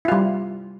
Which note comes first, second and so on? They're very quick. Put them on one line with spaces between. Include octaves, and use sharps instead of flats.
E4 F4 G3